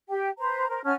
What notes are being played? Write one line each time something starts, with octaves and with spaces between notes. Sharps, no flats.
G4 G5
B4 C5 A#5
A#4 C5
C#4 F#5 A5 F6